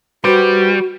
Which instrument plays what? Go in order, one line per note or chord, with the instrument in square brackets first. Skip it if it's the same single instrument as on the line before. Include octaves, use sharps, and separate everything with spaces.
[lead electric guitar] G3 [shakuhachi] F#4 [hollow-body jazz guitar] B4 C5